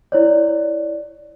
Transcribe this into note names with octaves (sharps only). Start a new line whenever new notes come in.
E4 C#5 D5